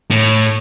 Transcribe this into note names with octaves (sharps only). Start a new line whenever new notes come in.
A2